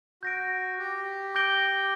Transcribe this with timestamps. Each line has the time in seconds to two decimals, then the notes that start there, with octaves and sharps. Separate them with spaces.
0.23 F#4 G6 A#6 D7
0.79 G4
1.35 D6 G6 A#6 D7 G7